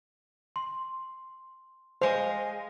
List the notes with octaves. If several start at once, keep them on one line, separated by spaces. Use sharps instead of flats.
C6
G#3 C5 F5